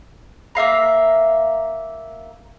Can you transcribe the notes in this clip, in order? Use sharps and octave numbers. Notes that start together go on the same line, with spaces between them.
A#3 E5 F5 A#5